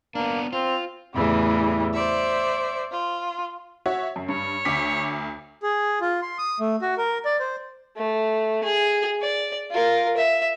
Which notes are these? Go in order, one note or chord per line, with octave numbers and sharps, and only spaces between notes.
A#3 B3 D4
C4 F4
E2 A2 C#3 E3 G3
C5 D5 E5
F4
F#4 C#5 E5
F#2
G2 C#5
D2 D6 B6
G#4
F4
C6
D#6
A3
F#4
A#4
D5
C5
A3
G#4
D5
F4 A#4
E5